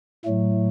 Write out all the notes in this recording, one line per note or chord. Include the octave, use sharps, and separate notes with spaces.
A2 F#3 A3